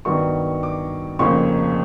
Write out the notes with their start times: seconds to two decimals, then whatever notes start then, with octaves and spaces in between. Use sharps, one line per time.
0.05 G2 D#3 F#3 B3 C#6
0.63 D6
1.19 F1 F2 C#3 F3 A#3 C#6